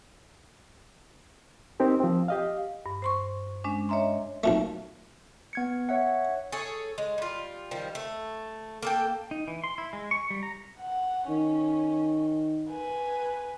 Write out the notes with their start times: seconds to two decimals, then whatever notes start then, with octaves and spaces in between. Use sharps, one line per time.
1.80 C4 D#4 G4 A#4
2.00 F3 C4
2.28 G4 D#5 F5
2.86 G2
3.02 C5 C6 C#6
3.64 G#3 C#4 D4
3.89 C#5 D#5 E5 A#5 C6
4.44 B1 A#2 A3
5.53 B3 G#6 C#7
5.89 C#5 E5 F#5
6.52 G#4 A4 C#5
6.98 G#3
7.18 G3 F4
7.71 D#3 F3 G3
7.95 A3
8.83 A#3 A4 G5
9.31 D#4
9.48 E3
9.64 C6
9.78 E4
9.93 G#3
10.11 C#6
10.30 G3
10.43 A#5
10.80 F#5
11.28 D#3 C#4
12.70 B4 G#5